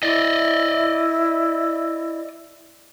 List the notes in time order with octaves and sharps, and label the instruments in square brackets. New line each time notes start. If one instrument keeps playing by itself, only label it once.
[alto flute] E4 [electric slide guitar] D5 D#5